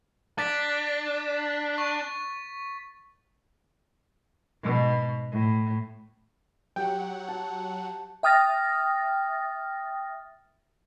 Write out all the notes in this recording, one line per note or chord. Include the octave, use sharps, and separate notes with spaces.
D4 A6 B6
C#6
G#2 B2
A2
F#3 G4 F#5 G5
A5
E5 G5 D#6 F6 A6 A#6